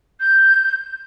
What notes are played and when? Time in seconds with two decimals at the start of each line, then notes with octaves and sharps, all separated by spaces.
0.20 G6